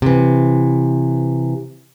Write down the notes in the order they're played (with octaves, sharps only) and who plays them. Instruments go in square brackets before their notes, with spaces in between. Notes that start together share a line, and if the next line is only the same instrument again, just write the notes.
[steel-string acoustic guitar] C3 E3